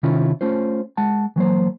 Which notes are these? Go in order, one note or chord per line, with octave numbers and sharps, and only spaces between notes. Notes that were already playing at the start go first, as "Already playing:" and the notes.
C3 D#3 C#4 E4 F4
A3 C#4 F4 C5
G#3 F#5 A5
E3 F#3 A#3 C5